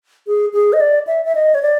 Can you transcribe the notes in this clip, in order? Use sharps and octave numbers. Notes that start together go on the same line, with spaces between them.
G#4
G#4
D#5
D5
E5
E5
D#5
C#5
D5